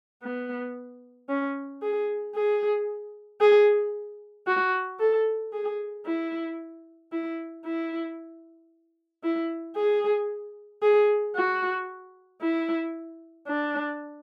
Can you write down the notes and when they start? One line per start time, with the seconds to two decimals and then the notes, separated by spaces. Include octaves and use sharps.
0.22 B3
1.29 C#4
1.82 G#4
2.35 G#4
3.41 G#4
4.47 F#4
5.00 A4
5.53 G#4
6.06 E4
7.12 E4
7.65 E4
9.23 E4
9.76 G#4
10.82 G#4
11.35 F#4
12.41 E4
13.47 D4